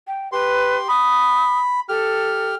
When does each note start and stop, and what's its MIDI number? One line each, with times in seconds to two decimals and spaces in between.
0.07 0.31 79
0.32 0.88 67
0.32 0.77 71
0.32 0.88 84
0.88 1.80 83
0.88 1.59 87
1.89 2.55 67
1.89 2.54 69
1.89 2.55 89